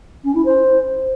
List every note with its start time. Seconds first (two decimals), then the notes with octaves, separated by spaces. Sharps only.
0.24 C#4
0.35 E4
0.45 C5